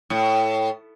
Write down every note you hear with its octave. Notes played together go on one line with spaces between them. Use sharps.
A2